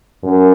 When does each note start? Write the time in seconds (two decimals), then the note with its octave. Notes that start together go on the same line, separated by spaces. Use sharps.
0.23 F#2